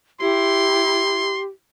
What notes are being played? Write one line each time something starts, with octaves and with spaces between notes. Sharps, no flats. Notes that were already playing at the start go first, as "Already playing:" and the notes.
E4 G4 C6